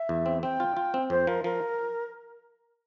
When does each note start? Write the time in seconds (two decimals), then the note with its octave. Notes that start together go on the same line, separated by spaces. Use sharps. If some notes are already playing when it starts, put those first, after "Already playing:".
Already playing: E5
0.09 E2
0.26 C4
0.43 C4 G5
0.60 F4
0.77 F4
0.94 C4
1.10 F2 C5
1.27 F3 A#4
1.44 F3 A#4